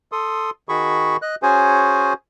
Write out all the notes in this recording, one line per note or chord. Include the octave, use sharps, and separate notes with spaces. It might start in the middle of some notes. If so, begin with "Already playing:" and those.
A4 C6 D#6
D#3 F#4 G#4 B5 C#6
D#5 F#6
C#4 F#4 G#4 C5 G#5